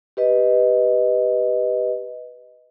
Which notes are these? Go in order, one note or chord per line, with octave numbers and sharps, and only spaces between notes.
G4 B4 D#5